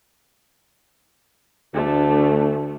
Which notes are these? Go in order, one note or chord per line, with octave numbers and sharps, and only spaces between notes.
D2 A3 D4